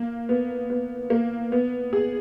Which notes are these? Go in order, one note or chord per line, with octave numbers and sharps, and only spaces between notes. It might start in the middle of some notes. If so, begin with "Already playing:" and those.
Already playing: A#3
B3
B3
A#3
B3
G#4